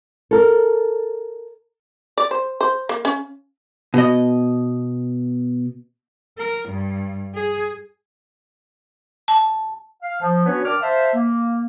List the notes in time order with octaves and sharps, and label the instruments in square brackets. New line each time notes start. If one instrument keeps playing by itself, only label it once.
[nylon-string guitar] A4 A#4
[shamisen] D5
C5
C5
A#3
C#4
[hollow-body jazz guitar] B2 D#5
[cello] A#4
G2
G#4
[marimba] A5
[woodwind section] F5
F3
B3 C#4 D4 F#4 B4 C#5
D#3 D4 A#4 D5 D6 F6
C5 E5 F5 A5
A#3